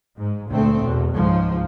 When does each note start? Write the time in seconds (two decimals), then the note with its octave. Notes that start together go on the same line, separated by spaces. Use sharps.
0.18 G#2
0.50 D2 A#2 A3 C4
0.82 E2 B2
1.16 C#2 G#2 F3